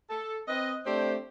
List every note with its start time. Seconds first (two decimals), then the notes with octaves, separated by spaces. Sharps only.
0.10 A4
0.48 C4 B4 D#5
0.86 A3 C4 D4 G4 C5